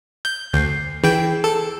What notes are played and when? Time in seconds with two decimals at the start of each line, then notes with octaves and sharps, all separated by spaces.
0.25 G6
0.53 D2 G6 C7
1.04 E3 E4 G#4 G5
1.44 A4